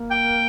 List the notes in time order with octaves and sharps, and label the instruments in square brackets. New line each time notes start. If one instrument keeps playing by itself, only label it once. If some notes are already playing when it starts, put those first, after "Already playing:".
Already playing: [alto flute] A#3
[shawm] G5